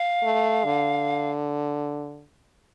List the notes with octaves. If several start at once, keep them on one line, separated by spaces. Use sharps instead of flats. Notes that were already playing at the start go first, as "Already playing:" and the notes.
Already playing: F5
A3
D3